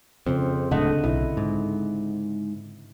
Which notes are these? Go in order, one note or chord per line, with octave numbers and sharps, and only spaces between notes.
F2 C#3 C4
D1 C#2 D3 A3 D#5 F#5
B1 E4
G#2